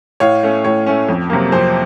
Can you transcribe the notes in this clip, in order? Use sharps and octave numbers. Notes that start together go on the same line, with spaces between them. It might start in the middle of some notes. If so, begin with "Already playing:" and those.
A2 C#5 F5
A3 C#4
A2 C#5
A3 C#4
F2
C3 F#3 A#3
F2 C5